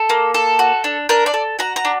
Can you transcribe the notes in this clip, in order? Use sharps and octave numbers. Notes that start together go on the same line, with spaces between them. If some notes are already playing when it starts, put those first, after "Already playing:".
Already playing: A4
A#3
A4
F#4
D4
D4 A#4
D5
A4
F#4 A#5
A#5
D4